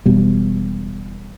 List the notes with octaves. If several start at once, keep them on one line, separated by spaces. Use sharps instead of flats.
E1 B2 G3